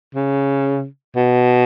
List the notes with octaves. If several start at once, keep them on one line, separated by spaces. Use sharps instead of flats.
C#3
B2